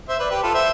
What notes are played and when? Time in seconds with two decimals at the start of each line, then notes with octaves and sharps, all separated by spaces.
0.09 C5 E5
0.19 B4 D5
0.31 G4 B4
0.43 F4 A4
0.54 C5 E5